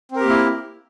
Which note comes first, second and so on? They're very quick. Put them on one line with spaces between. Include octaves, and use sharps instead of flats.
C4 A#4 G4 A#3 E4